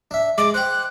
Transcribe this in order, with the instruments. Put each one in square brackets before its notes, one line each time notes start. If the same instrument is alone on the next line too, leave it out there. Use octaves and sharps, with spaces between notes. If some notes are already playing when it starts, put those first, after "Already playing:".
[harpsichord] D4 E5
[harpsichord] G#3 [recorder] D6
[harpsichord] C5 G5 [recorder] F#6